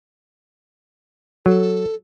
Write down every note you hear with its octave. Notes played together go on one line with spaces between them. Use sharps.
F#3 A4